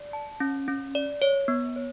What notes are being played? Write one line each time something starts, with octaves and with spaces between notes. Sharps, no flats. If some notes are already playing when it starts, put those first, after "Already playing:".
Already playing: D5
A5
C#4
C#4
D5
C#5
B3
C#5